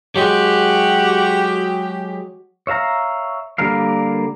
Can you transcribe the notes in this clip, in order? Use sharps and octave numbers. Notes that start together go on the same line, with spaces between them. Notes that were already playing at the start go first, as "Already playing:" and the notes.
F#3 G#3 F#4 G4
C#5 E5 F5 A#5
D3 G3 A#3 A#4 F5